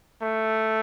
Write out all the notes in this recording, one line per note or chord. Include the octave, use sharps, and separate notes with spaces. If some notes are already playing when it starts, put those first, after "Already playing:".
A3